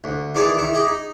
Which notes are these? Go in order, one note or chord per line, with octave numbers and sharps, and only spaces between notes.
D2
E2 D#3 E3 G#4 D5 G#5
D#3 E4
G4 G#4 D#5
D#4